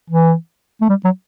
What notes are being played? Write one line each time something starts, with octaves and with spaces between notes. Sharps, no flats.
E3
A3
G3
F#3